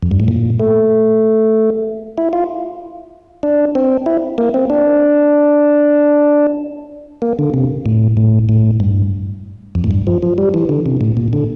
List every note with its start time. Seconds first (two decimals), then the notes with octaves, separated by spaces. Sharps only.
0.03 F2
0.11 G2
0.20 A2
0.28 A#2
0.60 A3
2.18 E4
2.33 F4
3.43 D4
3.75 C4
4.06 E4
4.38 A#3
4.54 C4
4.70 D4
7.22 A#3
7.39 D3
7.54 C3
7.86 A2
8.17 A2
8.49 A2
8.80 G2
9.75 F2
9.84 A2
9.91 G2
10.07 F3
10.23 F3
10.38 G3
10.54 E3
10.69 D3
10.86 C3
11.01 A2
11.17 A#2
11.33 D3